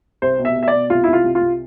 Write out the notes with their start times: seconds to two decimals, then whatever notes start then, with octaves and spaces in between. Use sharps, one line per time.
0.22 C2 C5
0.39 B2
0.45 E5
0.56 B2
0.63 E5
0.68 D5
0.73 B2
0.90 C2 F4
1.04 C2 E4
1.13 F4
1.24 C2
1.35 F4
1.41 C2